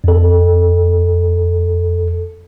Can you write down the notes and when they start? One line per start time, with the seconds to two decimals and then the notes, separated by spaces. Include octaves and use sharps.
0.04 F2 A4